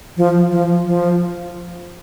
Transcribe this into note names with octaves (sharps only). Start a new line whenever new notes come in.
F3
F3
F3